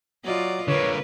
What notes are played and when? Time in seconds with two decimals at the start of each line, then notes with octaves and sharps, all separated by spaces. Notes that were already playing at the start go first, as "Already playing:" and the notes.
0.25 F#3 F4 D5 D#5
0.68 D3 A#3 B4 C#5